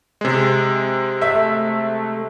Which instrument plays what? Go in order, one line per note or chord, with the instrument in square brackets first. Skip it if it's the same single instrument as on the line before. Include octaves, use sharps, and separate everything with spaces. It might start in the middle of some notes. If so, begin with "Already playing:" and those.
[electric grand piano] C3 G#3
[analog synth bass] A3 [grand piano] E5